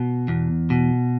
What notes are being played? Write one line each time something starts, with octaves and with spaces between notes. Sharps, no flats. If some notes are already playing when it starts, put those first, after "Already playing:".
Already playing: B2
E2
B2